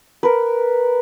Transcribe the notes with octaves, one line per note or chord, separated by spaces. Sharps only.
A#4 B4